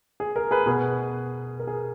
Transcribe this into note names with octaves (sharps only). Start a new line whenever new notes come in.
G#4
A#4
G#4 B4
B2 G#4 B4
A#4
G#4